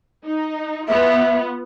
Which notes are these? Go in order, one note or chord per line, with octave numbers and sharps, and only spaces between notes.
D#4
B3 F4 E5